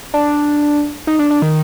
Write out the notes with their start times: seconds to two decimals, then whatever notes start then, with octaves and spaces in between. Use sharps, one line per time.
0.14 D4
1.07 D#4
1.19 D4
1.30 D4
1.42 D#3